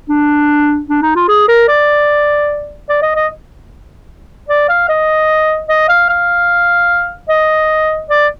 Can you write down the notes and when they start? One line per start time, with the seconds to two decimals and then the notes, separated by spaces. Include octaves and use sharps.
0.09 D4
0.89 D4
1.02 D#4
1.16 F4
1.28 G#4
1.48 A#4
1.68 D5
2.89 D5
3.02 D#5
3.15 D#5
4.49 D5
4.69 F5
4.89 D#5
5.69 D#5
5.89 F5
6.09 F5
7.29 D#5
8.10 D5